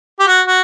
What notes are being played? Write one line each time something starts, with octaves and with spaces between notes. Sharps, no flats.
G4
F#4
F#4